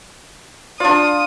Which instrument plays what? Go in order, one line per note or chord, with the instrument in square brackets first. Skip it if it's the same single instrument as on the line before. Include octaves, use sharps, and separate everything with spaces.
[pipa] D4 D5 [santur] F4 [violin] D#6